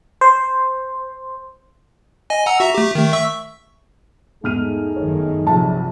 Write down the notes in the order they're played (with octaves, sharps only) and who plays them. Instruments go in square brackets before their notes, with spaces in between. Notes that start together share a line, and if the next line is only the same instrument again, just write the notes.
[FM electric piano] C5
[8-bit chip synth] D#5 G#5
F#5 A#5 E6
F#4 E5 A#5
A3 G4
D#3 A3
E5 C#6 E6
[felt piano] E2 F6 D#7 [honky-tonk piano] G#2 [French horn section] A3 D#4 G#4
[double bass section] G1 F#2 D#3 [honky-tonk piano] C#5
[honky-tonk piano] A#1 [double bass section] C3 F#3 [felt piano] A5